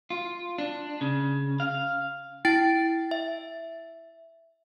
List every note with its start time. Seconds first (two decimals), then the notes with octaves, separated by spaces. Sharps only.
0.10 F4
0.58 D4
1.01 C#3
1.60 F5
2.45 E4 G5 A6 D7
3.11 E5